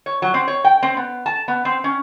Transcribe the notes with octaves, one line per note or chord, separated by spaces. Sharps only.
C#5
F#3
C4
C#5
G5
C4
B3
A5
B3
C4
C#4